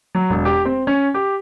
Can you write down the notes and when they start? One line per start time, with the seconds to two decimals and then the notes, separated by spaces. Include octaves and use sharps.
0.15 F#3
0.30 E1
0.45 G4
0.65 C4
0.87 C#4
1.14 G4